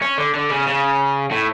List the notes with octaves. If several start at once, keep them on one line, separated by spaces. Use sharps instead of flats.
C#4
D3
D3
C#3
C#3
A2